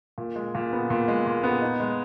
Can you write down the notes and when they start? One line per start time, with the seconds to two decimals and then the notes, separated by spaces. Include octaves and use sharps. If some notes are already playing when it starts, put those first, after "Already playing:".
0.18 A#2
0.36 G#3
0.55 A#2
0.73 B3
0.90 A#2
1.08 G#3
1.26 A#2
1.44 B3
1.62 D#4
1.80 G#3